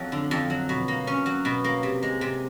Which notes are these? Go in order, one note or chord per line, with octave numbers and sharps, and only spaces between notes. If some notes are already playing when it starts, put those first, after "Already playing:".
Already playing: F2 F#3
D3
F2
F#3
B2
A#3
C#4
F#3
B2
A#3
C3
G#3
C3